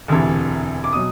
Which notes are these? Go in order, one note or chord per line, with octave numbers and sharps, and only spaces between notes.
E1 D2 C3 E3
D6
B2 F#3 D#6